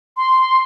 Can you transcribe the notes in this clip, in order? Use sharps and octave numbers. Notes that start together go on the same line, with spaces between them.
C6